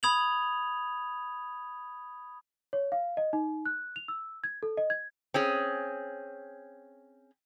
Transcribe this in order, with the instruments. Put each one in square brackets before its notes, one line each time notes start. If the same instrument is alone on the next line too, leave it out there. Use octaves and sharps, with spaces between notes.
[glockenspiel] B5 D#6 G#6 F7 F#7
[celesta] C#5
F5
D#5
D#4
F#6
F7
E6
G#6
A4
D#5
G#6
[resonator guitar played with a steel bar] C4 C#4 G#4